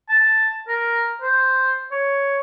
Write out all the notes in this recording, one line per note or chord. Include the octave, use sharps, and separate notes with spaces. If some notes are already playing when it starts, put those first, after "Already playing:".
A5
A#4
C5
C#5